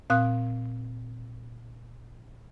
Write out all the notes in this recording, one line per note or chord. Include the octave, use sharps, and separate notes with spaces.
A#2 C4 F5 D#6 F#6